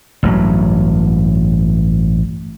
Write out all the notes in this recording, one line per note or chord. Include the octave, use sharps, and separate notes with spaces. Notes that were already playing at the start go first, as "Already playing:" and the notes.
A1 G2 F#3